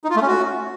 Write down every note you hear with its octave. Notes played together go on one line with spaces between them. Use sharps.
D#4
F4
A3
C#4
F#4